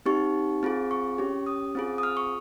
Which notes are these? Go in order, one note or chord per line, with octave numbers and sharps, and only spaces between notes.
C4 D#4 G4 C#6
C4 F4 G#4
C#6
C#4 G4
D#6
C4 F4 G#4
D#6
F6
C#6